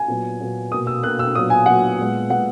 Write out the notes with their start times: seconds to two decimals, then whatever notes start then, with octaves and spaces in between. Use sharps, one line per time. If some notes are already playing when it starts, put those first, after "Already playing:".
Already playing: G#5
0.08 A#2 F#3 B3
0.40 A#2 F#3 B3
0.72 B2 A#3 D#6
0.87 E6
1.03 B2 A#3 F#6
1.19 E6
1.35 A#2 F#3 B3 D#6
1.50 G#5
1.66 A#2 F#3 B3 F#5
1.99 A#2 G#3 B3
2.30 A#2 G#3 B3 F#5